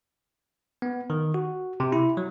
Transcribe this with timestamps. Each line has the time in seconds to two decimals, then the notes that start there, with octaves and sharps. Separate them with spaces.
0.82 B3
1.10 D#3
1.34 F#4
1.80 C3
1.92 E4
2.17 F#3